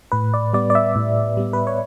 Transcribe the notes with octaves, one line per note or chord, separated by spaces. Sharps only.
A2 B4
D5
G3 B3 D5
D5
E5
A2
G3 B3
B4
C#5